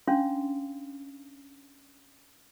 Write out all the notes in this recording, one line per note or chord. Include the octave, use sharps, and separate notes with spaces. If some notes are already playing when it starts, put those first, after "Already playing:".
C#4 D4 F5 C6